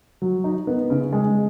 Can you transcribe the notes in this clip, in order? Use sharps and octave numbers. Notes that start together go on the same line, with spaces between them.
F#3
D#4
B3
C#3
G#3